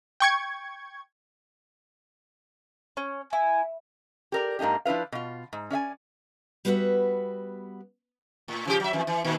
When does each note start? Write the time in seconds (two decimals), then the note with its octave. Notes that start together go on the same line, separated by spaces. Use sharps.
0.20 G5 C#6 G#6
2.97 C#4
3.33 E4 G#5
4.32 G4 A#4 D5
4.59 G#2 A#3 D4 D#4 G4
4.85 F3 D4 E4 B4 F5
5.12 B2 F4
5.53 G#2
5.70 C#4 D5 E5 G#5
6.65 G3 B3 E4 F#4 B4 E5
8.48 A2
8.65 C#3 F3 G4
8.80 F#3 E5
8.93 F2 E3
9.07 E3
9.24 A#2 D#3